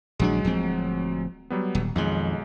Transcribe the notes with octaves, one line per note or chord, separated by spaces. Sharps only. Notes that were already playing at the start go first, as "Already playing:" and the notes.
A#1 D#3 F#3 G#3 D4
D1 F3 C4
F#3 G3 B3
D#1
B1 F2 D#3 F3 G#3